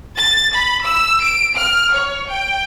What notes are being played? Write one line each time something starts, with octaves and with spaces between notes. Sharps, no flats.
A6
B5
E6
D7
F6
C#5
G5